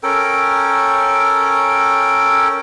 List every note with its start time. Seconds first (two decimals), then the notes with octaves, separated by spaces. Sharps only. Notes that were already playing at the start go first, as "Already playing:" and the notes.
0.03 C#4 A4 A#4 G5